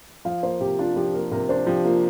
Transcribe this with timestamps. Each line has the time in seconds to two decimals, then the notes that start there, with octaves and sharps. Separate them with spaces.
0.25 F3 F5
0.43 A#3 C5
0.60 C3 G4
0.79 D4 F4
0.96 F3 G4
1.14 A#3 A#4
1.32 C3 A#4
1.49 D4 C5
1.67 F3 G4
1.85 A#3 F4